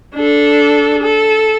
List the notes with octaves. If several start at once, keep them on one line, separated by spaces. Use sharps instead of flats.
D4 A4
A4